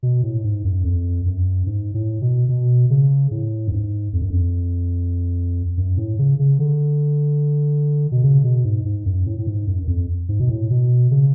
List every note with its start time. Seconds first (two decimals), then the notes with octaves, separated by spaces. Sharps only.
0.03 B2
0.23 A2
0.44 G#2
0.64 F#2
0.84 F2
1.26 F#2
1.66 G#2
1.94 A2
2.21 B2
2.49 B2
2.90 C#3
3.31 A2
3.67 F#2
3.72 G#2
4.13 F2
4.22 F#2
4.30 F2
5.77 F#2
5.97 A2
6.19 C#3
6.39 C#3
6.59 D3
8.12 B2
8.24 C#3
8.44 B2
8.64 G#2
8.85 G#2
9.05 F#2
9.26 A2
9.38 A2
9.47 G#2
9.67 F#2
9.83 F#2
9.88 F2
10.29 G#2
10.40 B2
10.49 A2
10.70 B2
11.11 C#3